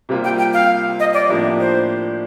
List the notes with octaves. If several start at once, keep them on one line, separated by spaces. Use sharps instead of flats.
C3 G3 A#3 F4
G5
G5
F5
D#5
D5
A2 F3 A#3 D4 G4
C5